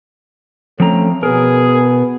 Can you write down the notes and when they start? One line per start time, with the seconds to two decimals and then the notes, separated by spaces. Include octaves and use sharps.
0.80 F3 A3 C4 C#4 A#5
1.23 B2 B3 G#4 A#4